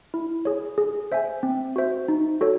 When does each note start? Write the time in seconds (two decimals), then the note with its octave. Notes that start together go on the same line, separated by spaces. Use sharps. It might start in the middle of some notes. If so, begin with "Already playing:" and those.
0.14 E4
0.45 G#4 C#5
0.78 G#4
1.12 C5 E5 G#5
1.43 C4
1.76 F#4 C5 E5
2.08 D#4
2.41 F#4 A4 C#5